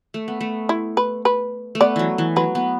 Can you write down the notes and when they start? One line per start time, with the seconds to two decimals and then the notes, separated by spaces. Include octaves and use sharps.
0.14 A3
0.28 B3
0.41 A3
0.69 E4
0.97 B4
1.25 B4
1.75 A3
1.81 B3 D5
1.96 E3 F#3
2.18 E3
2.36 F#3 B4
2.55 B3